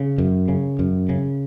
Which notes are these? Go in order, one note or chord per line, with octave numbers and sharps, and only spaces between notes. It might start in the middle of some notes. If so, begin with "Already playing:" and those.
Already playing: C#3
F#2
C#3
F#2
C#3